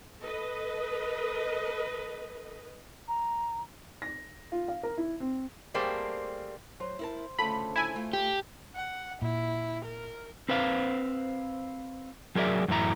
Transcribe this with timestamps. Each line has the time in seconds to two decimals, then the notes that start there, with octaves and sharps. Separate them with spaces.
0.22 A4 B4 D#5
3.08 A#5
4.02 A#6
4.52 F4
4.68 F5
4.83 A#4
4.98 E4
5.20 C4
5.74 G3 A3 A#3 C4 G#4 C5
6.80 F#3 C5
6.99 E4 A#4 A5
7.39 D2 C#3 F4 A4 B5
7.76 E4 G#5
7.95 A3 F4
8.13 G4
8.76 F#5
9.22 A#2 E4
9.85 A#4
10.49 C4 B4 C5 F5
12.35 F#3 G#4 A#4 D5 E5
12.68 F#2 A2 E3 A3 E4 A#5